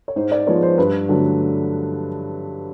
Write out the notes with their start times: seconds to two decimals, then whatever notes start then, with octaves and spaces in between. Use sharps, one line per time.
0.08 C#5
0.16 G#2 C5
0.32 D5
0.47 F3 G#3 B3 C#5
0.63 C5
0.78 G2 B4
1.09 D3 F#3 A3